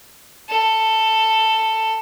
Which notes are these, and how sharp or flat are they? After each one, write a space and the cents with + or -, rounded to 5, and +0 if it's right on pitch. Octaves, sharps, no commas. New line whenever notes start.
A4 +10